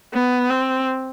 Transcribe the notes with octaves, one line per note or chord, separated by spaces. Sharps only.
B3
C4